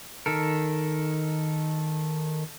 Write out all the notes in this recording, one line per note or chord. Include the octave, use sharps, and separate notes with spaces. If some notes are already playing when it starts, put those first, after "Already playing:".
D#3 A4 A#4